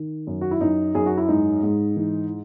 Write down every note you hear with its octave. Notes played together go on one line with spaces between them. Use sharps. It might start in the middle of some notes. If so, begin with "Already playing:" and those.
Already playing: D#3
F#2
F#4
E4
F#2 D#4
F#2 G#4
F#4
E4
G#2 D#4
G#2
E3